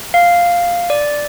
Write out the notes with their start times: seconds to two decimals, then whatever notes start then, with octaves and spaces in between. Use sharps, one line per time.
0.14 F5
0.90 D5